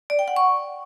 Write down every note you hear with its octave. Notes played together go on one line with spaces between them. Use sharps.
D5
G5
F#5
C#6